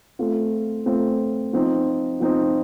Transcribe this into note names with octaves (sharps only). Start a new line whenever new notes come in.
A3 C4 F4
A3 C4 F4
F3 C4 D#4
F3 C4 D#4